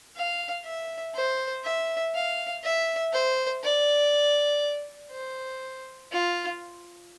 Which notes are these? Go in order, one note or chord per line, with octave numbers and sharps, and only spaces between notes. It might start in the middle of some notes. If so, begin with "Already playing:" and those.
F5
E5
C5
E5
F5
E5
C5
D5
C5
F4